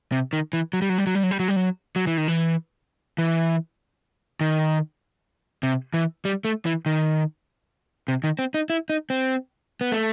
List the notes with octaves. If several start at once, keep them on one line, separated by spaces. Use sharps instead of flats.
C3
D#3
E3
F#3
G3
F#3
G3
F#3
G3
F#3
G3
F#3
G3
F#3
F#3
E3
D#3
E3
E3
D#3
C3
E3
G3
A3
E3
D#3
C3
D#3
C4
D#4
E4
D#4
C4
B3
A3